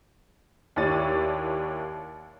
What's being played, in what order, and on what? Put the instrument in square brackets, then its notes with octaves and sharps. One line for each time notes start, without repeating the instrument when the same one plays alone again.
[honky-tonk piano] D#2 E4 C#5 D5 A6 D#7